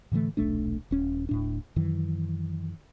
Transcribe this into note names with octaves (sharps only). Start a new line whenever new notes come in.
A2 D3 E3 A3
D#1 B1 A3 D4
D#1 C#4
D1 A2 D4
F#2 D#3 E3 F#3